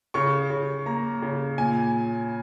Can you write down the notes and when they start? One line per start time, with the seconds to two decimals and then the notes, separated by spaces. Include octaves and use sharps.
0.14 C#3 C#6
0.50 C#3
0.86 A#3 A#5
1.22 C#3
1.58 A#2 G#5